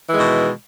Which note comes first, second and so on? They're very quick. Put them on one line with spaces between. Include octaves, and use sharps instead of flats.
E3 G#3 D#3 B2